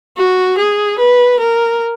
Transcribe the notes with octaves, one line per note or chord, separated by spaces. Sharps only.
F#4
G#4
B4
A#4